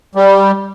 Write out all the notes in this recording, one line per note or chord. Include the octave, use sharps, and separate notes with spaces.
G3